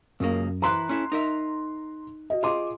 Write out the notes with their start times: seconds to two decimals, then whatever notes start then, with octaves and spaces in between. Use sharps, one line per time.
0.20 C#2 F#2 C#3 A#3
0.62 E3 E4 B4 A#5 C6 F#6
0.89 C#4 E4 A4
1.12 D#4 A#4 E5
2.30 F#4 D#5
2.43 F4 G#4 D#5 C6 D6